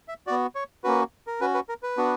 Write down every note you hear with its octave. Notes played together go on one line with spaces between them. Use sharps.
E5
B3 F#4 D5
C#5
A#3 C#4 F#4 B4
A#4
C#4 F#4 B4
B4
A#4
B4
B3 D4 F#4